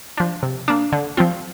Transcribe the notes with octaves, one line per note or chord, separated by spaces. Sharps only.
F3 D4
C3
A#3 D4
D3
F3 C4 F4